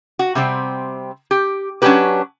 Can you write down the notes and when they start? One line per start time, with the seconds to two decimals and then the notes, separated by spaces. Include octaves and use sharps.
0.19 F#4
0.35 C3 G3 C4
1.31 G4
1.82 F#3 C#4 D4 E4 G4 B4